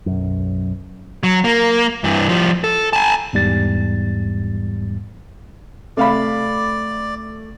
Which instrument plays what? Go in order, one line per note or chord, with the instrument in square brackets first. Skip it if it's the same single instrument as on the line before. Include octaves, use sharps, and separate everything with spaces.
[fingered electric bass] B1 F#2
[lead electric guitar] F#3
A#3
G2 E3
F3 G3
A4
G#5 A5
[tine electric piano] E2 G#2 G3 A6
[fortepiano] C3 F5 B5 [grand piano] A3 [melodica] D5